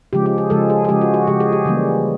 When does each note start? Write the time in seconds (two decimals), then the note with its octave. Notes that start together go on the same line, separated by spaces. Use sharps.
0.13 C#3 F3 G#3 G4
0.26 G4
0.38 G#4
0.50 C#3 F3 G#3 A4
0.70 G#4
0.85 G#4
0.89 C#3 F3 G#3 G4
1.01 F#4
1.14 F#4
1.27 C#3 F3 G#3 G4
1.40 G#4
1.53 G4
1.65 C#3 E3 G3 A#3